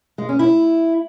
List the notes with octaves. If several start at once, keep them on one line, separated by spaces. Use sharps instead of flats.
G#3
C#4
E4